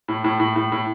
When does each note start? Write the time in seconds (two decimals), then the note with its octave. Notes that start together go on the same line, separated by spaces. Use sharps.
0.08 A2
0.24 A2
0.40 A2
0.56 A2
0.72 A2